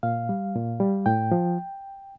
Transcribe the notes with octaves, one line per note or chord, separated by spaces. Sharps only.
A#2 F5
G3
A#2
G3
A2 G5
F3